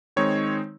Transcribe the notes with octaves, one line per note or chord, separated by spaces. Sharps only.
D#3 G#3 C4 D#4 C#5